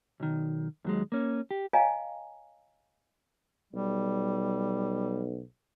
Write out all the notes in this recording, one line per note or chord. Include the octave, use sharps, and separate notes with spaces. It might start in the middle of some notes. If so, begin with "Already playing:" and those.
B1 D#3
D#2 F#3 G#3
A#3 C#4
G4
C#5 D#5 F5 G5 G#5 A#5
B1 G3